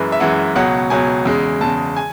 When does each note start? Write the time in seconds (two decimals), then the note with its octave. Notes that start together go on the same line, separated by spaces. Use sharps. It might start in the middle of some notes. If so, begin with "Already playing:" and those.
Already playing: F#2 E3 G#3 B4
0.12 E5
0.20 F#2 E3 G#3 F#5
0.55 C#2 B2 F#3 F#5
0.90 C#2 B2 F#3 G#5
1.25 E2 C#3 G#3
1.61 E2 C#3 G#3 A5
1.96 G#5